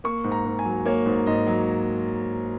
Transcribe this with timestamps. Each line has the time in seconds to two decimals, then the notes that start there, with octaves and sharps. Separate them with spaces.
0.04 A#3 C#6
0.24 G#2
0.32 A#5
0.45 G#2
0.59 G#5
0.65 F#3
0.86 A#3 C#5
1.06 G#2
1.27 G#2 D#5
1.47 F#3